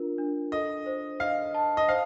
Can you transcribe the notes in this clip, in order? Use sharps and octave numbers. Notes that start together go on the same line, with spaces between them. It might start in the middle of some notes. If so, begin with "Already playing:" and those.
Already playing: D4 F4 A#4
D4
A4 D#5
C5
D#5 F5
A5
D#5
C5 F5